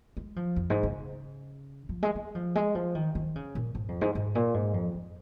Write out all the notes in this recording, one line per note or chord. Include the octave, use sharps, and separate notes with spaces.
G#3
F3
F2
G#2
C#3
F3
G#3
G#3
F3
G#3
F3
D#3
D#3
C#3
A#2
G#2
F2
G#2
G#2
A#2
G#2
F2
F2